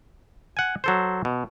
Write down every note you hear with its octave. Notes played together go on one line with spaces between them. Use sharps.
F#5 G#5
F#3 A4 C5
B2